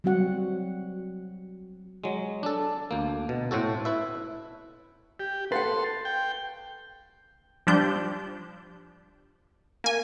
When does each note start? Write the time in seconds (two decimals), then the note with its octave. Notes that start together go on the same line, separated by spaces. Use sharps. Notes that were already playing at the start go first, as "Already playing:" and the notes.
0.04 F#3 G3 C4 F#4 F#5
2.04 F#3 G#3
2.43 D4 A4
2.91 D2 A#3
3.29 B2
3.51 A2 C4 F#4 A4
3.85 E4 B4 E5
5.20 G4
5.52 A4 B4 F5 F#5 C6
6.05 G5
7.67 F3 G3 D4 G6
9.84 A#3 G#5